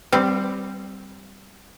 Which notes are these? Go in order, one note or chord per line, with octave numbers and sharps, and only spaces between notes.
G3 C4